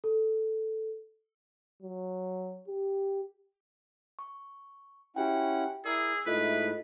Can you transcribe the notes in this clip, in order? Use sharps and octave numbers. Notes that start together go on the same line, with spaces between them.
A4
F#3
G4
C#6
C#4 E4 F#4 G4 F#5 G5
E4 G#4 A#4 D5 E6
G#2 A3 E4 F4 A4 B4 D#5